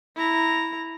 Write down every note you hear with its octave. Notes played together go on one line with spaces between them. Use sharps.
E4 A#5